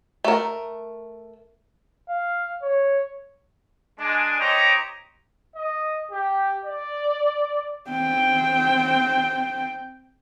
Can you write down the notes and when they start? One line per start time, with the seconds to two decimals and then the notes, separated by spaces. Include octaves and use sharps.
0.24 A3 A#4
2.09 F5
2.62 C#5
3.99 G#3 D4 G#5
4.39 D#4 G4 C5 C#5 D#5 A#5
5.55 D#5
6.11 G4
6.65 D5
7.90 C4 G5